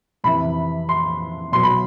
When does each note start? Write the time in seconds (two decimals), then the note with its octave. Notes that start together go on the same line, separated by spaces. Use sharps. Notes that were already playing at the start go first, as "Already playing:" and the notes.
0.24 F2 C3 E3 B5
0.89 C6
1.52 B2 F#3 C6
1.63 B5